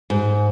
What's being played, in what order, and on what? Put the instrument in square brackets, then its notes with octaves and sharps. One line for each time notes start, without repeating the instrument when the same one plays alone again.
[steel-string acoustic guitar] G#2